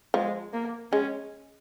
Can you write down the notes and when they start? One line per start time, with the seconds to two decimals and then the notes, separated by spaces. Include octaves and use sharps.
0.14 F3 G#3
0.53 A#3
0.92 G#3 C#4